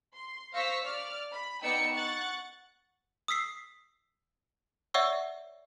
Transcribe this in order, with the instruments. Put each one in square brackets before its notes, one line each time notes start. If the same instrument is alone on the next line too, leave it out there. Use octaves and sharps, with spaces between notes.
[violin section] C6
C5 F5 C#6 E6 A#6 B6
D5 F6
B5
B3 D#4 D5 G5 E6 C#7
F#5 C#6 F#6 A6
[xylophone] D#6 E6 B6 C7
C#5 D5 E5 F#5 C#6 E6